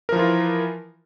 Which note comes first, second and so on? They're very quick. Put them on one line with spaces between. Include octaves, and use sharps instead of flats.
A#4 F3 E3 F4